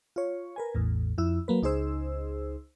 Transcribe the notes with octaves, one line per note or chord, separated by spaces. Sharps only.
F4 C#5
A#4 B4 G#5
A1 E2 A2
F2 E4 E6
F#3 A#3 B4
C#2 D#4 G#4 C5 E6